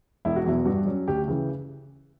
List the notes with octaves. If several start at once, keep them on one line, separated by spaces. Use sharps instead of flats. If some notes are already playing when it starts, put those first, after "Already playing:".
E1 E4
F#4
E2 B2 F#3 E4
G2 F#4
F#3 C#4
D2 G4
C#3 E3